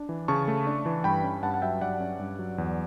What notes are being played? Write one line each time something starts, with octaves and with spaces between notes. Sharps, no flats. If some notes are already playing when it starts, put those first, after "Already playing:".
Already playing: D4
E3
C#3 A5 C#6
A3
D4
E3
G2 G5 B5
C#4
G2 F#5 A5
F#5
F#3 E5 G5
G2 D5 F#5
C#4
G2
F#3
E2